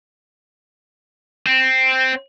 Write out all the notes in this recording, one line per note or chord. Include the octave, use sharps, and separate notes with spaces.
C4